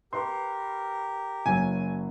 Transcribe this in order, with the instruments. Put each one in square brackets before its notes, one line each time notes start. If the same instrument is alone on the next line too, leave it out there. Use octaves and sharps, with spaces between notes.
[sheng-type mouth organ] G4 A#4 [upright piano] B4 C6
[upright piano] F#1 F#3 [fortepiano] G#5